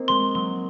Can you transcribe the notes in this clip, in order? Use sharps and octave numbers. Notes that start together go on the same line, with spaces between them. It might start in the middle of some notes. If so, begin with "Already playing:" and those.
Already playing: A#3 C4 D#4
G#3 C6
F#3 C6